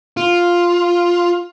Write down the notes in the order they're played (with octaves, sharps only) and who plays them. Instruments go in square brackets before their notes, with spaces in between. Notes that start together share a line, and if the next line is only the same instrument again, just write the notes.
[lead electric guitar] F4